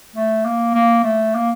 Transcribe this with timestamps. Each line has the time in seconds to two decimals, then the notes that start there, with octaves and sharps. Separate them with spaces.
0.16 A3
0.45 A#3
0.74 A#3
1.04 A3
1.35 A#3